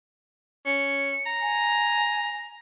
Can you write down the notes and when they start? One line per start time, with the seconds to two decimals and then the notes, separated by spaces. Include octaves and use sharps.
0.66 C#4 C#7
1.26 A#5
1.41 G#5